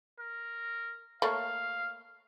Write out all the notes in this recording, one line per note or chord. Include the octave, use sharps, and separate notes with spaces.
A#4
A3 A#3 C#5 F5